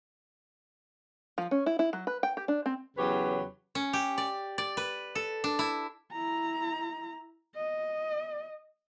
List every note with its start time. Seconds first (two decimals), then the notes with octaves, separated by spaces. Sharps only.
1.38 F3
1.51 C#4
1.66 E4
1.79 E4
1.93 F#3
2.07 B4
2.23 G5
2.37 G4
2.48 D4
2.66 C4
2.97 E2 C#3 F#3 G4 B4 C#5
3.75 C#4
3.93 G4
4.18 D5
4.58 D5
4.77 B4
5.15 A4
5.44 D4
5.59 E4
6.12 E4 A#5
7.56 D#5